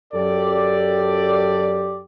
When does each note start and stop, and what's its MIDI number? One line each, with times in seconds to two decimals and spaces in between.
0.13 2.01 42
0.13 2.01 67
0.13 2.01 69
0.13 2.01 74